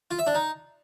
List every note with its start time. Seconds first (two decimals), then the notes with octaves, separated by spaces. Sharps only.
0.11 F4
0.19 E5
0.27 D4
0.35 D#4